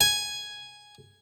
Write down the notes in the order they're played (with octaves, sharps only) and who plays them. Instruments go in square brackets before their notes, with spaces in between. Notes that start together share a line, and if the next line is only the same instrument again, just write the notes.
[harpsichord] G#5